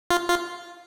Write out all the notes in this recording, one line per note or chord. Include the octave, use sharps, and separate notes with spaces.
F4
F4